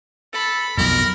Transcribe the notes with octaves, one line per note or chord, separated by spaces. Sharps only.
A4 B5
B1 F2 A#4